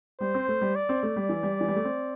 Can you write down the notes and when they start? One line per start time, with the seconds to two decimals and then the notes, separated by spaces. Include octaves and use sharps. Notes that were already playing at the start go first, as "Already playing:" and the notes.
0.20 G3 C5
0.34 C4
0.48 A3
0.61 G3
0.76 D5
0.89 C4
1.03 A3
1.16 G3
1.29 E3
1.43 G3
1.61 E3
1.68 G3
1.76 A3
1.84 C4